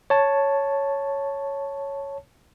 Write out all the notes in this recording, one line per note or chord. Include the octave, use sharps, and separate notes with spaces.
C#5 A5